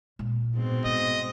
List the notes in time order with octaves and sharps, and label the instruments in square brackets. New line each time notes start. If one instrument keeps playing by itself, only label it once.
[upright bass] A#2
[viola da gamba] G#2 B2 C4
[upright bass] A3 [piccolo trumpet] D#5